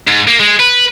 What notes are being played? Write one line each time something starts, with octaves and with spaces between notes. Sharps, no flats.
G#2
A#3
G#3
B4